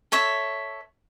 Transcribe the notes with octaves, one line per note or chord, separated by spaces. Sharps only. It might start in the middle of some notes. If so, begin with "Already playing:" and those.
A4 C#5 E5